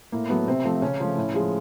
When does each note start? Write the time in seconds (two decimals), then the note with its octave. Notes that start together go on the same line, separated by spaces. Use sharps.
0.12 A2 A#3
0.29 F#3 A3 B3
0.48 C3 C4
0.64 F3 A3
0.82 C#3 C#4
1.00 F3 A3
1.17 A2
1.34 F3 G#3